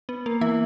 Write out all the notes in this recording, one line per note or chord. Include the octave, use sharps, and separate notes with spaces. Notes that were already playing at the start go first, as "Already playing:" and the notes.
B3
A#3
E3 E4